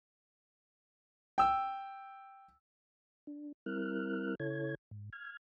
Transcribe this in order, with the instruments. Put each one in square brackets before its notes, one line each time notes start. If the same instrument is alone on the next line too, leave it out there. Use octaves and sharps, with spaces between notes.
[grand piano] G5 E6
[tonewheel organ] D4
G3 C4 E4 A#4 F6 F#6
C#3 E4 A4 C#5 G#6
G#2
F6 G#6